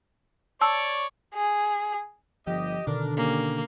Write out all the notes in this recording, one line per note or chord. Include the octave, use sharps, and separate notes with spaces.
C#5 D5 A5 E6
G#4
G1 F3 G4 D#5
B2 D3 D#3 D4 A#4
A#3 C#4 G4